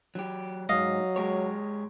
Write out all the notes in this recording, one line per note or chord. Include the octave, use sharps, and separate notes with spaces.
F#3 G4
G#2 F#3 D#5 F5
G#3 G4 C#5